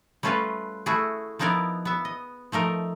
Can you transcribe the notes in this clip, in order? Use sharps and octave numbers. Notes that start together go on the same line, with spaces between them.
G3 A3 C#4 F4 A4 B4
A3 E4 F#4 G#4
F3 B3 D#4 E4 A#4 D5
B3 E5
D#5
F3 A3 D#4 A#4